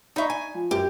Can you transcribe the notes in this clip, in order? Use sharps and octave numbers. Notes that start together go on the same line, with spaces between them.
D#4 E5 A#5 B5 C#6
G#5
F3
F#2 G4